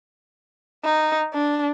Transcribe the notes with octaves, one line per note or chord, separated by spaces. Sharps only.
D#4
D4